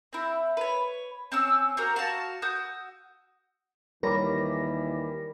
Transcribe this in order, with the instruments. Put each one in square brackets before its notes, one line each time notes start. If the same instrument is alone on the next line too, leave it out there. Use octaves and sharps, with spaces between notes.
[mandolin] C4 E4
B4 C#5
C4 C#4 E6
C4 F#4 G4 A#4
F#4 F5 A5
F#4 D#6 E6 G6
[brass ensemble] D#2 E3 [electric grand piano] G3 [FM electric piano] A#4 A#6 [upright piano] C#5 B5 D6